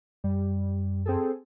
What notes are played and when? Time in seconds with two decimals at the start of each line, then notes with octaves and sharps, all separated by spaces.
0.24 F#2 G3
1.06 C4 G#4 A4